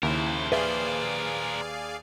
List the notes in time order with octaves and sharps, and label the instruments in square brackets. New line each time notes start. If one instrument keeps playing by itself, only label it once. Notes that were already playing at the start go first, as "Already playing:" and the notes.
[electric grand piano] D#2 [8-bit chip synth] C#3 E4 [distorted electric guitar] A#4 C5
[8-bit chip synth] G#4 D5 F5 [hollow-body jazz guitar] B4 E5